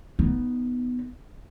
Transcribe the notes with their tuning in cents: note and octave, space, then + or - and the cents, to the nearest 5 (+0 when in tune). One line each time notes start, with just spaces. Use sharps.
B3 +0 D#4 +0